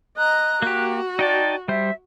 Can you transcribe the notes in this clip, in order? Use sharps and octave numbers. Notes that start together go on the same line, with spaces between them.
D#5 A#5 F#6
A#3 F#4 G4
D#4 D5 G5 A5
G3 C5 E5